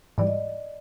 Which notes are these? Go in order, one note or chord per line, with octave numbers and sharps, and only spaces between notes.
G#2 E3 G3 D5
D#5